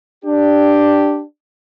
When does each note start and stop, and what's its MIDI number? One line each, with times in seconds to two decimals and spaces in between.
0.25 1.22 62
0.25 1.22 67